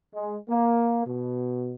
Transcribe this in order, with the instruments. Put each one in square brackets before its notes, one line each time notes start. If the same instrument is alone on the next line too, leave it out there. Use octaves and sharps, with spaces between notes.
[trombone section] G#3
A#3
B2